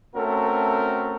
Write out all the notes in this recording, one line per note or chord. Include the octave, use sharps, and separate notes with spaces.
A3 C4 C#4 F#4 A4 A#4